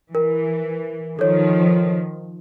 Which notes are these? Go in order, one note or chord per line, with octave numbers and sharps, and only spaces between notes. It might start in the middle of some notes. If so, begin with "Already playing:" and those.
E3 A#4
D#3 F3 A4 C#5